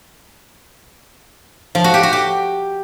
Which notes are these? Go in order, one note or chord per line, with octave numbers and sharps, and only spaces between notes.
F3
F#4
G4
F#4
G4